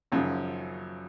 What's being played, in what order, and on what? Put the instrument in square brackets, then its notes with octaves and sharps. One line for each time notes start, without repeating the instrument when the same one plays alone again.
[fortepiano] G#1 F#2 C#3 F3